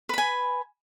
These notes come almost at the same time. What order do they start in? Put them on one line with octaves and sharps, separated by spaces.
B4 B5 G#5